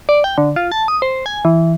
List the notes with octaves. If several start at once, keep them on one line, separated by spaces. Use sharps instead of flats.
D5
G5
D3
F4
A5
D#6
C5
G#5
E3